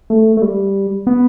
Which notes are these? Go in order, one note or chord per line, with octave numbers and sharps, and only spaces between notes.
A3
A3
G3
B3